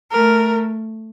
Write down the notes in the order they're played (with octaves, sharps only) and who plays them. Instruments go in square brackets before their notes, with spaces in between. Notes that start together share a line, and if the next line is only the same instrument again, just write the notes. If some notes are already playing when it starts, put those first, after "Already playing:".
[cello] A3 [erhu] A#4